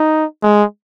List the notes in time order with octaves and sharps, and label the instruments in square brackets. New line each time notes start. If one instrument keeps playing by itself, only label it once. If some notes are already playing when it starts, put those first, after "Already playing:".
Already playing: [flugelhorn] D#4
G#3